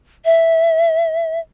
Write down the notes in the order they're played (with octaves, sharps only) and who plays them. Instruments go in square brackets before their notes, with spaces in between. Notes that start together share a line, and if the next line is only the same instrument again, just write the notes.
[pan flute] E5